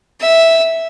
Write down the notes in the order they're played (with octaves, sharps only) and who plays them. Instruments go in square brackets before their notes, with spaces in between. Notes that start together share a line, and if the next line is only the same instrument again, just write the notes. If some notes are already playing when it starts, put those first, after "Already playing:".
[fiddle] E5